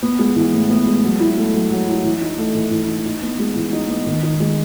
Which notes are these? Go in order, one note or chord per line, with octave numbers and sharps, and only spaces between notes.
B3
G#3
E3
A2
B3
G#3
F#3
E4
A3
F#3
F#3
E4
E3
D#4
A3
E3
E3
D#4
D#4
B3
G#3
E3
D#4
B3
D#3
D#4
G#3